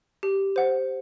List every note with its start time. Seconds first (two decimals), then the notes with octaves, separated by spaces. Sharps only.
0.23 G4
0.56 C5 F#5